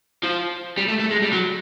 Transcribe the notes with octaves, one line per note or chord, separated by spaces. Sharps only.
F3
G3
A3
A3
G#3
G3
F#3